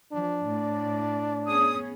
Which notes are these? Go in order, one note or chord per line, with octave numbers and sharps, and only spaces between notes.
F3 D4
A2 D5
B3 C#4 G#4 D#6